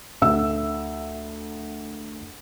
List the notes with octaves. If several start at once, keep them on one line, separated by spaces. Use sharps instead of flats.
D2 E5 E6